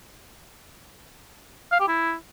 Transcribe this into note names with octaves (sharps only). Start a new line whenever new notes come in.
F5
G4
E4